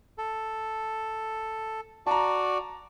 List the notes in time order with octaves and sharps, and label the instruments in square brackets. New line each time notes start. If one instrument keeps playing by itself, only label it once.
[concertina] A4
[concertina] F#4 D5 [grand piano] A5 A#5